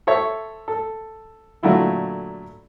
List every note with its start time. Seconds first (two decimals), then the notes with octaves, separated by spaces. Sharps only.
0.07 A4 C5 C#5 E5
0.68 A4
1.63 A#2 D3 F#3 A3 E4 F4